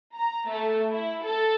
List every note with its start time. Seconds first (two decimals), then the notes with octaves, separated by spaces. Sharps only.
0.15 A#5
0.50 A3
0.91 E4
1.24 A4